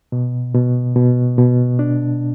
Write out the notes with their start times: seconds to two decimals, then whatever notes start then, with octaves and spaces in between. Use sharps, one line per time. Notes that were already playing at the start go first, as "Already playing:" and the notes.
0.12 B2
0.54 B2
0.96 B2
1.38 B2
1.79 D4